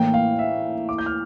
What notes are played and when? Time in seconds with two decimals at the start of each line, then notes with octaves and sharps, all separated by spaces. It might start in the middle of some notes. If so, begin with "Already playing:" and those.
Already playing: A2 E3 A#3 G5
0.14 F5
0.39 E5
0.89 D6
0.98 G6
1.06 F6